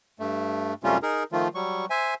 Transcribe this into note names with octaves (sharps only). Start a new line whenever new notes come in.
G2 A3
F#2 C3 G3 A3 C#4 F4
D#4 G#4 A#4
D#3 F3 A3 F4
F#3 G3 C#6
C5 E5 G#5